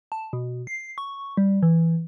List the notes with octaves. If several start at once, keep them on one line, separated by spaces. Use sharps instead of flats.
A5
B2
C7
C#6
G3
E3